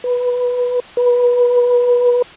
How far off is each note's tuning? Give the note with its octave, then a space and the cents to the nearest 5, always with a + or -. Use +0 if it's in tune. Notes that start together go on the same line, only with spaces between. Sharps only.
B4 -5
B4 -20